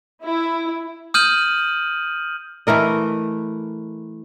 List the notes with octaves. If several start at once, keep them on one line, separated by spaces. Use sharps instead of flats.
E4
D#6 F6 G6 D#7 F#7
E3 A3 A#4 D#5